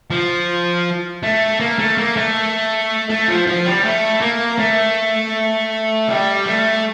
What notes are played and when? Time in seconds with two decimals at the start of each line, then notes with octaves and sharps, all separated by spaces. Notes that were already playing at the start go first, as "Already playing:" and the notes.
0.11 F3
1.23 A3
1.60 A#3
1.79 A3
1.98 A#3
2.16 A3
3.10 A3
3.28 F3
3.47 F3
3.66 G3
3.84 A3
4.21 A#3
4.59 A3
6.09 G3
6.46 A3